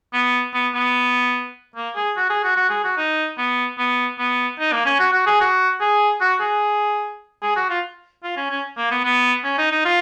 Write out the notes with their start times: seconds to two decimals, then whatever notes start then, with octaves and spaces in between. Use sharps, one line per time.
0.14 B3
0.54 B3
0.74 B3
1.76 A#3
1.96 G#4
2.17 F#4
2.30 G#4
2.44 F#4
2.56 F#4
2.70 G#4
2.84 F#4
2.98 D#4
3.38 B3
3.78 B3
4.19 B3
4.59 D#4
4.72 A#3
4.86 C#4
5.00 F#4
5.13 F#4
5.27 G#4
5.41 F#4
5.81 G#4
6.21 F#4
6.41 G#4
7.42 G#4
7.56 F#4
7.70 F4
8.24 F4
8.37 C#4
8.51 C#4
8.77 A#3
8.91 B3
9.05 B3
9.44 C#4
9.58 D#4
9.72 D#4
9.85 F4